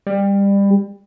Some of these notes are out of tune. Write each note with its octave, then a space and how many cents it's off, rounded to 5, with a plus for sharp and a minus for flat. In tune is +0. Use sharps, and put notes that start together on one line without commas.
G3 +25